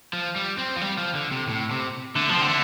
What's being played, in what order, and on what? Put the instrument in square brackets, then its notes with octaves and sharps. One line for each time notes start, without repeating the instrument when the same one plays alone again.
[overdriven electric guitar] F3
G3
C4
F3
G3
F3
D3
C3
A2
C3
[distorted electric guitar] D3 [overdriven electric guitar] A3
[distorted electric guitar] F3 [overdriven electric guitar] C4
[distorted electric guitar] D3
[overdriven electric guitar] A3